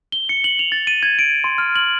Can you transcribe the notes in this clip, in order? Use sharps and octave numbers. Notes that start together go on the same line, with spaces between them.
G7
C#7
F#7
F7
A6
D#7
G#6
D7
C6
F6
F#7